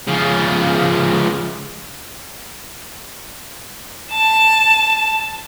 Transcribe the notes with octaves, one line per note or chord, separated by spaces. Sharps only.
C#3 F3
A5